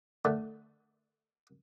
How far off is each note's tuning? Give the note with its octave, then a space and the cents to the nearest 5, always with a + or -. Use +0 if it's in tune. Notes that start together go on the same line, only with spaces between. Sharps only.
D3 +15 A3 +0